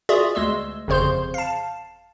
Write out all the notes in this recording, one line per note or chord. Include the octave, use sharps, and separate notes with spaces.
F4 F#4 G#4 D5 E5
D2 G#3 C6 E6
G1 F2 C#3 C5 C6 G6
F5 A5